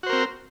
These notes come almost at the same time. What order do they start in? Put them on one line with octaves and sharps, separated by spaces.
F#4 C5 A#4 C4